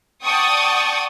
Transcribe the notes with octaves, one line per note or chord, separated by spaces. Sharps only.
D5 F#5 G5 A5 C#6 D#6